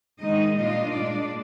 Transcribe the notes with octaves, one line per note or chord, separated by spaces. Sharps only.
D#3 G#3 D#4 D#5
A#2 G3 D4 F4 D#5
A#2 G#3 D4 D5